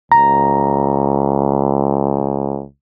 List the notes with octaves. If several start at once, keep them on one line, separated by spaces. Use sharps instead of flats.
C#2 A#5